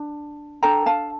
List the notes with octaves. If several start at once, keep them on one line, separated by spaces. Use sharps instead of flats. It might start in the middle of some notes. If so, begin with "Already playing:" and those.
Already playing: D4
D4 A4 G5 A#5
F5 A5